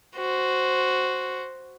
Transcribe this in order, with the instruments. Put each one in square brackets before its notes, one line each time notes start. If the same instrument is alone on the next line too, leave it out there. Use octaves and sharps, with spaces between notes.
[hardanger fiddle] F#4 C5